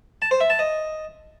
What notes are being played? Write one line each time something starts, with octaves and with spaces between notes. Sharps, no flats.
A5
C5
E5
A5
D#5